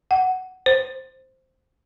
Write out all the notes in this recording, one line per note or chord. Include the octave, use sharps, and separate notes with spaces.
F#5
C5